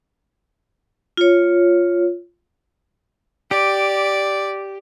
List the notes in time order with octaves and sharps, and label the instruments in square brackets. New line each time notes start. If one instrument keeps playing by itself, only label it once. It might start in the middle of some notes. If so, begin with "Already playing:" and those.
[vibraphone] F4 C#5
[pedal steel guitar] G4 [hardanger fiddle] D5